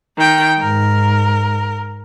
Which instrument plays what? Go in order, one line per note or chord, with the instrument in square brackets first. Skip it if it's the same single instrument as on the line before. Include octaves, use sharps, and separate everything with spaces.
[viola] D#3 G5
[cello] G#2 [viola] A#4